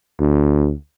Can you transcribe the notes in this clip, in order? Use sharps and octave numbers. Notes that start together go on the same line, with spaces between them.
D2